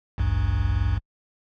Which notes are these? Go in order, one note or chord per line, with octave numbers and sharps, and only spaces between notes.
A1 D2 G2